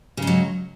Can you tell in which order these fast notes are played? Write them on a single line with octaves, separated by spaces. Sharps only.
C#3 G#3 F#3